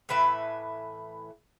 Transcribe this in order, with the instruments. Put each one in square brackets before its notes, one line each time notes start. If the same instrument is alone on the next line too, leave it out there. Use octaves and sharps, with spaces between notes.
[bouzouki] A2 E3 B4 E5